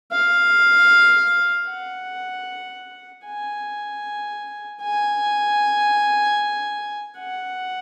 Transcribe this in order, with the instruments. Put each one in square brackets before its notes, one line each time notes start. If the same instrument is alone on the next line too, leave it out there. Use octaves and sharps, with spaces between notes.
[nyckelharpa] F5
F#5
G#5
G#5
F#5